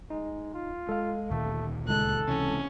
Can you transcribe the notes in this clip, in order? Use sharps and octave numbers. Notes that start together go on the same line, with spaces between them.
G#3 D#4
F4
G#3 A4 F5
D2 A#2 D#3 A3
C#2 G#3 A4 F#6
C3 E3 C#4